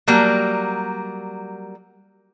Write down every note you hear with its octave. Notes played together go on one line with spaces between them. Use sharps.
F#3 G3 A#3